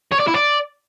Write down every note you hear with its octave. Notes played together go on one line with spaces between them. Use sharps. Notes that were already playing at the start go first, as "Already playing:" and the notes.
C#5
D5
E4
D5